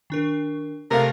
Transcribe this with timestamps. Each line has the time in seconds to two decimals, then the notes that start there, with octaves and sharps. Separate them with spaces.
0.10 D#3 D4 A#4
0.91 C3 A3 A#4 F5